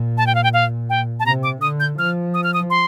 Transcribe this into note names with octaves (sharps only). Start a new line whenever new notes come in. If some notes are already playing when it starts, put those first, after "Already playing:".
Already playing: A#2
A5
G5
F5
G5
F5
G5
A5
C3 A#5
D6
D3 D#6
G6
F3 F6
D#6
F6
D#6
C6